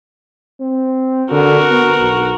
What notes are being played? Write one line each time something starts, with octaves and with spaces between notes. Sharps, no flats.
C4
D3 F#4 A#4
B3
B1